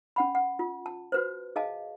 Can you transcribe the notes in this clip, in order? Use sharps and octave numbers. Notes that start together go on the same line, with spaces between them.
C#4 F#5 B5
F#5
F4
A5
F#4 B4 C5
G#4 D#5 F5 A5